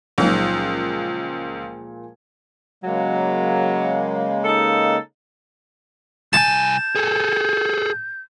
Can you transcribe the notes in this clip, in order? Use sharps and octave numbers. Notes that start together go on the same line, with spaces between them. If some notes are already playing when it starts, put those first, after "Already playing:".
C#2 A#2 F3 F#3 G#3 A#3 D#4
C#3 F#3 G#3 A#3
D#4 A4
C2 G#5 A5 G6
G#4 A4